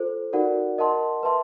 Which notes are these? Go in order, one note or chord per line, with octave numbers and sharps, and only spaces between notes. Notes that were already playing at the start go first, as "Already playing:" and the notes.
Already playing: F4 A4 C5
D#4 F#4 A#4 D5 F#5
A#4 D#5 F#5 A5 C6
B4 E5 A5 C6